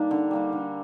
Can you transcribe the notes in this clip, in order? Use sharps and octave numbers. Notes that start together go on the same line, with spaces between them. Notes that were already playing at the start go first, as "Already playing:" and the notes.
Already playing: G3 A#3 D4 D#4
D3
G3 A#3 D4
D3